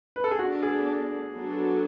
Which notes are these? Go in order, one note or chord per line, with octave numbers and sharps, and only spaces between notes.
B4
A4
G#4
B3 D4 F#4 A4
G#4
F#3 B3 D4 F#4 A4